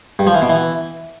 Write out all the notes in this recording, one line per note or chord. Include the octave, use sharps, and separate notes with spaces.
G2
F3
E3
B2
E3